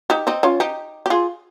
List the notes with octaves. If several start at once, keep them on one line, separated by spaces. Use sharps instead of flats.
D#4 G4
C4 D#4
C#4 F4
D#4 G4
G4
F4 G#4